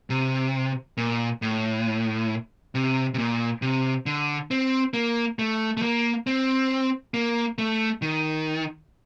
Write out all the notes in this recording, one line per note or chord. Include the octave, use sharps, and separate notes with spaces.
C3
A#2
A2
C3
C3
A#2
C3
D3
C4
A#3
A3
A3
A#3
C4
A#3
A3
D#3